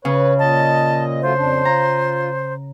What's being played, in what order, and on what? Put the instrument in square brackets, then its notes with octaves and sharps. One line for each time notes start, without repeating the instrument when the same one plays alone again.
[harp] C#3 [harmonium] B4 C#5
[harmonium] A#2 D#5 [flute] A5
[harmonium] F#3 A3 F4 [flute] C5
[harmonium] F2 D4
[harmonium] F4 [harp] A#5